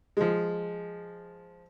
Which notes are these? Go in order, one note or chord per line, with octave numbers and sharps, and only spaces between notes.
F3 G#3